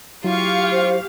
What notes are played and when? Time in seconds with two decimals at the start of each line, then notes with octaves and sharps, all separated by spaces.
0.24 F#3 E4 F4 G4 F5 C#6
0.72 C5